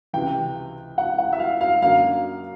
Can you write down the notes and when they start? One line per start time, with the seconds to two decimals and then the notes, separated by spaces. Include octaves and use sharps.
0.13 C#2 C3 E3 G5
0.98 F#5
1.18 F#5
1.33 E5
1.40 F5
1.61 F5
1.82 F#2 D3 F#3 A#3 D4 F5